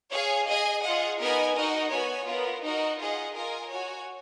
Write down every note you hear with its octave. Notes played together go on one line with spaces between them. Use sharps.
G#4 C#5 F5 G#5
G#4 D#5 G#5
F4 G#4 D#5 F#5
B3 D#4 A#4 D#5 G#5
D#4 F#4 A#4 D#5
B3 F#4 C#5 G#5
B3 F4 A#4
D#4 F#4 A#4 D#5
F4 G#4 D#5 F#5
F4 A#4 D#5 G#5
F#4 C#5 G#5